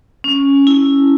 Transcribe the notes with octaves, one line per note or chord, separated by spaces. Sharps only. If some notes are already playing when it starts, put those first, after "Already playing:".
C#4
E4